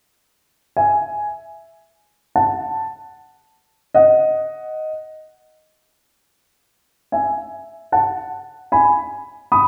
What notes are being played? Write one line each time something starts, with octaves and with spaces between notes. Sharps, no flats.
E5 G#5
F#5 A5
D#5 F#5
E5 G#5
F#5 A5
G#5 B5
B5 D#6